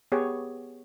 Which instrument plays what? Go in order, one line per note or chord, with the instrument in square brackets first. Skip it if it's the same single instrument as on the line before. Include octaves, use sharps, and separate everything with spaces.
[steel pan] B3 G4 G#4 C#5